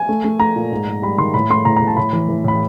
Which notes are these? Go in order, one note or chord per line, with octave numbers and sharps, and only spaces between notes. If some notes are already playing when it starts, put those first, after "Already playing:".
Already playing: G#5
A3
A3
A3 A#5
A#2
G#2
G#2
G3 B5
D#3 C6
A2 B5
A3 C6
A2 A#5
A#5
A2
A5
A2 B5
E3
E3
A2 B5